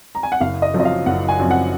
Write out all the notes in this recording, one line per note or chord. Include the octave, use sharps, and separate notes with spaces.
A#5
G#5
F#5
F#1 F5
D#5
F#2 F3 C4
D#5
F5
F#1 F#5
G#5
F#2 F3 C4
F#5